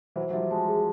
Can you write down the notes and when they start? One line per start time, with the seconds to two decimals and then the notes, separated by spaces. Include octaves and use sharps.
0.16 E3 F#3 C5
0.30 F#3
0.33 F3 G3 E5
0.51 F#3 G#3 A5
0.68 G#4